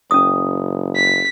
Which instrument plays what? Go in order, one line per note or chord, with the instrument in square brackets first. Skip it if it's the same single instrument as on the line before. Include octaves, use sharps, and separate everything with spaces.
[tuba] F#1 [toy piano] C#4 D#6
[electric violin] B6